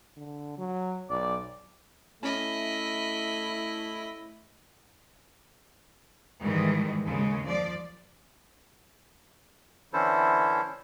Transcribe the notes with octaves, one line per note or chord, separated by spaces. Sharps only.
D3
F#3
B1 D5
A3 C#4 E4 D#5 B5
G#2 D#3 E3 G3 G#3
D#2 C#3 G#3
F3 D5
D3 E3 C#4 E4 A4 C5